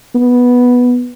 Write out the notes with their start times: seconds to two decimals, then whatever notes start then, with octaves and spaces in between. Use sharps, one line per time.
0.15 B3